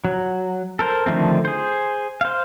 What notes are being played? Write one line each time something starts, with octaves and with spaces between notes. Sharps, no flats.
F#3
A4 A#4 C5
D3 D#3 F3 A3 C4
G#4 C5
C5 F5